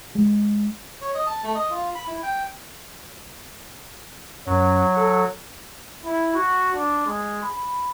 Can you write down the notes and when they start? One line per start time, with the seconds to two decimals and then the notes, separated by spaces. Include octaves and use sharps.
0.15 G#3
1.01 C#5
1.15 D#5
1.27 A5
1.43 A3
1.55 D#5
1.70 F4
1.95 B5
2.07 E4
2.23 G5
4.47 F#2 F#3
4.96 A4
6.05 E4
6.35 F#4
6.75 D4
7.06 G#3
7.43 B5